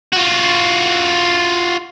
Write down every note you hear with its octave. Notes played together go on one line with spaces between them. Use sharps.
F4 F#4